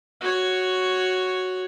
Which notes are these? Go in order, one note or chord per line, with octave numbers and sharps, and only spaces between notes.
F#4 C#5